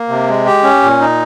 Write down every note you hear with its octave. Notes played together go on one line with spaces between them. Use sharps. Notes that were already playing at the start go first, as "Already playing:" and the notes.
Already playing: A#3
C3
G#3
G4
C#4
A#2
D#4